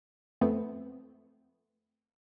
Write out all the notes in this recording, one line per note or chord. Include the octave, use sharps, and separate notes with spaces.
F2 A3 B3 C4